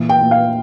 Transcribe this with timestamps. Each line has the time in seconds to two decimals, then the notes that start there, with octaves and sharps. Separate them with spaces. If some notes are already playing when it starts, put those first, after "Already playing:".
Already playing: A#2 E3
0.09 G5
0.21 A#2
0.31 F5